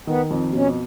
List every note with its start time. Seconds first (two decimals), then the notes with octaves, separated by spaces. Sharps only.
0.07 D#3 B3
0.30 F2
0.53 B2 C#4